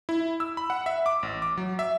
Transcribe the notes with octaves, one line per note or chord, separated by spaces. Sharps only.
E4
E6
B5
F#5
E5
D6
A1
D6
F#3
E5